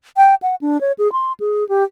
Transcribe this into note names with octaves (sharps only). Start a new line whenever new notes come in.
G5
F#5
D4
C#5
G#4
C6
G#4
G4